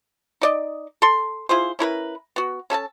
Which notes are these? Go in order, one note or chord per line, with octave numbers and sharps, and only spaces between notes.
D#4 D5 D#5
A4 C6
E4 F4 G#4 C5
C#4 E4 A#4 B4
B3 F#4
C#4 A4 G#5 A5